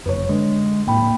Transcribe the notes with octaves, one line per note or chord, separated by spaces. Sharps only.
G1 F#2 B4 C#5
D3 G#3
D#1 A2 A#3 G5 B5